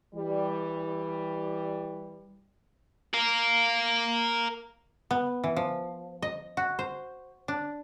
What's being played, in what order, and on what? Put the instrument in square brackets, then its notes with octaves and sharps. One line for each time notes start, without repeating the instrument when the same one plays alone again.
[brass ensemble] E3 G3
[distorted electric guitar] A#4 F5
[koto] B3
E3
F3
D#5
F#4
C5
D4